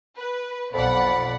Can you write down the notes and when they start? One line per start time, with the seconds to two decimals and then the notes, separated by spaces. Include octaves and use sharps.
0.17 B4
0.74 B1 F2 D5 F#5 B5